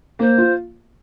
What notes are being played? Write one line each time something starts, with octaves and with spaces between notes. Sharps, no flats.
A#3 C5
F4